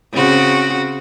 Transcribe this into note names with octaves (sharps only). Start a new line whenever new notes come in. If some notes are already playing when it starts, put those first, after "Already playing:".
C#3 C4 F#4